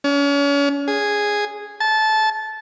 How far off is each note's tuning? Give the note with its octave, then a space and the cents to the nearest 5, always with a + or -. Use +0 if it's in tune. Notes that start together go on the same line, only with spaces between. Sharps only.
C#4 +35
G#4 -5
A5 -15